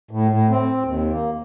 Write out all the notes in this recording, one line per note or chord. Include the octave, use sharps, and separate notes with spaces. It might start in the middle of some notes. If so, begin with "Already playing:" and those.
A2
A2
C4
D#2
A#3